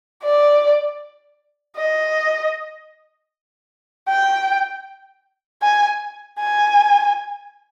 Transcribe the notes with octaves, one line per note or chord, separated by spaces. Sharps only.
D5
D#5
G5
G#5
G#5